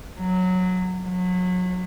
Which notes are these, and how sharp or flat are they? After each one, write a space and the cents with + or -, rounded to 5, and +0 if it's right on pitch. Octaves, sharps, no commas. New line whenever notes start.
F#3 -10
F#3 -30